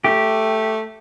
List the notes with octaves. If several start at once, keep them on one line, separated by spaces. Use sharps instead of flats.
A3 G4